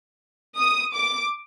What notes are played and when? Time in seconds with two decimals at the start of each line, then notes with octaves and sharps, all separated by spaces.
0.58 D#6
0.93 D6